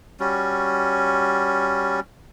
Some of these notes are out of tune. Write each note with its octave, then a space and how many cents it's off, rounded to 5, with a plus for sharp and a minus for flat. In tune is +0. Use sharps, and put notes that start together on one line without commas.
G3 +0 C#4 +0 F#4 +0